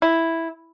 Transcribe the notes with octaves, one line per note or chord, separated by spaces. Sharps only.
E4